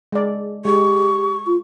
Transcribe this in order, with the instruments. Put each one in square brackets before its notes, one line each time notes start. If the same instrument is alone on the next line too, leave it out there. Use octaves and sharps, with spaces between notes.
[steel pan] G#3 D5
[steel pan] G#3 [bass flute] G4 [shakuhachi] C#6
[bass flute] F4